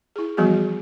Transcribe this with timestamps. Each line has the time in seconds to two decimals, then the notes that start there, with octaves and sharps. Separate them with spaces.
0.16 E4 G#4
0.37 E3 F3 G3 B3 F#4 G#4